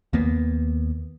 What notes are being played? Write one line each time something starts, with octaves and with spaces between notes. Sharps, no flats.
D#2 A#3 B3